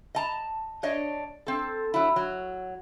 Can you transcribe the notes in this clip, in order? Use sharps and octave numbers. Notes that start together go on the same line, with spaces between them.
D#5 A5 A#5
D4 C#5 D#5
C4 A4
F#3 E4
F#3